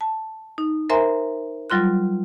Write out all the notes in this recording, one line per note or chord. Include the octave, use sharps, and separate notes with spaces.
A5
D#4
A#4 C5 E5 G#5 A#5 C6
F#3 G3 F4 C6 F#6